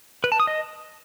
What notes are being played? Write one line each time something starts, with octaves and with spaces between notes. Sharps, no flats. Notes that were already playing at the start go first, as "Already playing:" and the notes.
B4
A5
D#6
D#5